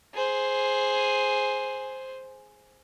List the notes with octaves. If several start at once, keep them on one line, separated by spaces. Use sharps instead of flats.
G#4 C5